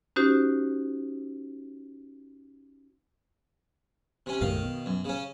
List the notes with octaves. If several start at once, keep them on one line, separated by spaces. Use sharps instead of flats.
C#4 D#4 F#4 G4 C5
C3 C#4
B1 F#2 A2 D#3 F5
B2
F#2
C#3 C#4